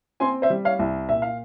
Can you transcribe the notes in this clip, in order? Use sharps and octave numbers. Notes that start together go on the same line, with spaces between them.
C4 G#5 C6
C5 E5
G3
C#5 F5
C2
A#2 E5
F5